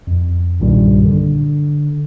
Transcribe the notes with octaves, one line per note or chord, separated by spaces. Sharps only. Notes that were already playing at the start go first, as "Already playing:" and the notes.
F2
B1 G2 A#2 D#3 G3
D3